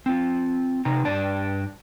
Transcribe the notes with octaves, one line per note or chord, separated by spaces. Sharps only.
C4 F4
C3 D#4 A#5
G2 D4 D5 A5